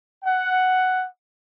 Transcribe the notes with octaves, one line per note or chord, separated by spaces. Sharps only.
F#5